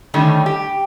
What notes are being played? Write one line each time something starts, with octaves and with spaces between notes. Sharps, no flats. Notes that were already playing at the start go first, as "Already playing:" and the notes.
D3 D#3 G3 A3 C#4
G4